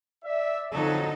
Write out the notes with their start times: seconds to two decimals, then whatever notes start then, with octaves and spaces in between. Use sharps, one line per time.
0.25 D5 E5
0.73 F2 D3 F#3 D#4 A4